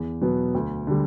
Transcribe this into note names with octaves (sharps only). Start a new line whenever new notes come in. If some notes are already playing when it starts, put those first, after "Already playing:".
Already playing: E2
B2 F#3 B3
D2
D3 G3